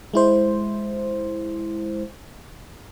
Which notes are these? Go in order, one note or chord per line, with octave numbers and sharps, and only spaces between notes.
G#3 E4 C5